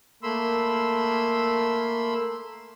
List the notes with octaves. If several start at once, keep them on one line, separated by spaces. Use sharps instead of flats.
A3 A#3 B5 C6 E6